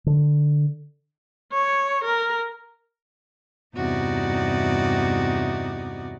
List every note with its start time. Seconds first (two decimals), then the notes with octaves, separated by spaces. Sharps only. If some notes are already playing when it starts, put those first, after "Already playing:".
0.06 D3
1.53 C#5
2.04 A#4
3.77 E2 G2 C3 D#4 F#4 D5